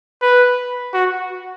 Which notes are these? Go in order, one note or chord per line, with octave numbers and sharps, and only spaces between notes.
B4
F#4